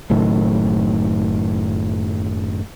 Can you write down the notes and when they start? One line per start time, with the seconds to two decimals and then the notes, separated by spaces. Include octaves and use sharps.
0.10 F#1 F#2 A2 D#3